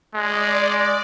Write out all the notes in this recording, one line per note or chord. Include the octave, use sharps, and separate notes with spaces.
G#3 D5